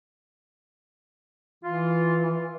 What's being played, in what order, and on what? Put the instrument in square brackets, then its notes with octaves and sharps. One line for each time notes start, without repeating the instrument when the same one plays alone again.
[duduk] E3 [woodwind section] F4